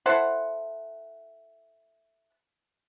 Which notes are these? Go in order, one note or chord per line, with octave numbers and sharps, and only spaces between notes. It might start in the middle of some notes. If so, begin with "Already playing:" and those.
E4 A4 C5 F#5